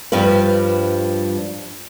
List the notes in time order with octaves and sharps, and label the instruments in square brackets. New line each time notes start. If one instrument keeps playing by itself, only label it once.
[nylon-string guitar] G2 F3 G3 B4